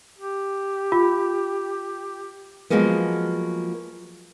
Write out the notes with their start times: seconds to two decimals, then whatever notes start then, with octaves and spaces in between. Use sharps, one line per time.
0.19 G4
0.92 F4
2.70 F3 F#3 G#3 A#3 B3